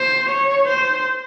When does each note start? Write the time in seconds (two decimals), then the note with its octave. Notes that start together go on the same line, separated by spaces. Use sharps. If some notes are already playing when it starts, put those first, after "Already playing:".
Already playing: C5
0.30 C#5
0.69 C5